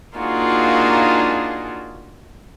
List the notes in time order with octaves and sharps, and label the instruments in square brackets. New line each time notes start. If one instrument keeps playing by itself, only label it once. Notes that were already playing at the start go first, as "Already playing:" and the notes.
[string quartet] A#3 D4 D#4 F4 F#4 G#4